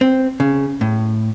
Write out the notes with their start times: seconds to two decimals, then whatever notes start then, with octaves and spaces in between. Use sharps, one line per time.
0.01 C4
0.40 C#3
0.81 A2